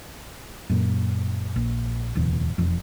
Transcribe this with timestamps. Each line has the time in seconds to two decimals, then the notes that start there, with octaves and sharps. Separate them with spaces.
0.70 F#2 A#2
1.56 A#1
2.15 D1 E2 B2
2.58 E1 F2